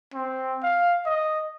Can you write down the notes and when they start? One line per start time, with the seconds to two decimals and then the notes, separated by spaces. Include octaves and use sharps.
0.14 C4
0.63 F5
1.06 D#5